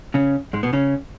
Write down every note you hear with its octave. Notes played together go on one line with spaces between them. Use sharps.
C#3 C#4
G#2 G#3
B2 B3
C#3 C#4